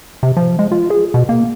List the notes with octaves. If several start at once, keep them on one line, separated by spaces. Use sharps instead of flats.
C3
F3
G#3
F4
G#4
B2
A#3